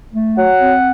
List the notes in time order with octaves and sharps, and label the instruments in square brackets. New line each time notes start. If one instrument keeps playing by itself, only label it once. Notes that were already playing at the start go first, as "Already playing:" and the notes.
[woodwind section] A3
F#3 F#5
C4